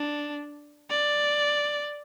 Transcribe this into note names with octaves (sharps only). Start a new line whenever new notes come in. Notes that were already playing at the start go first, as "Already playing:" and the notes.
Already playing: D4
D5